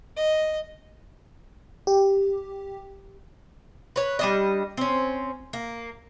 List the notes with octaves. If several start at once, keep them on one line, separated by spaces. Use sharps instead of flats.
D#5
G4
B4 C#5
G3 D4 D#5
C4 C#4
A#3